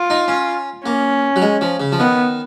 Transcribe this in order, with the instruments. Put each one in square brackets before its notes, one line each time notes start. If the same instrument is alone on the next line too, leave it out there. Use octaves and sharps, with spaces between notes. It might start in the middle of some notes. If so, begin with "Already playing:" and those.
Already playing: [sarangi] F4
[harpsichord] D#4
C#4
[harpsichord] A#3 [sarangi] C#4
[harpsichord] F#3
G#3
F3
C#3
F3
[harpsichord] D#3 [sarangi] B3